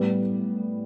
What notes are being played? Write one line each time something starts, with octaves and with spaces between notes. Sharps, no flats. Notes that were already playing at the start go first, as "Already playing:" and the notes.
Already playing: A2 G3 B3